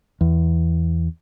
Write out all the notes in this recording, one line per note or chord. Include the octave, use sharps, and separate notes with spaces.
E2